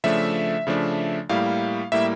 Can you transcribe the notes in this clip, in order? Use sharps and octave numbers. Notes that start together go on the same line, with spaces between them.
C#3 F3 A3 D4 E5
C#3 F3 A3 D4
A2 G3 A#3 E4 F5
A2 G3 A#3 E4 E5